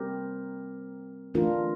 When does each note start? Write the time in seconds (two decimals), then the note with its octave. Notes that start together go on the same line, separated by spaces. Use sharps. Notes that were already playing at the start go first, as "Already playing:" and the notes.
Already playing: G3 C4 G4 A#4
1.34 E3 A3 D4 F4 A#4